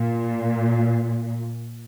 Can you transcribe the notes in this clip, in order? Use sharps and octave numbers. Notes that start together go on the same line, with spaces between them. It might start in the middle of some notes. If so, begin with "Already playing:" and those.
Already playing: A#2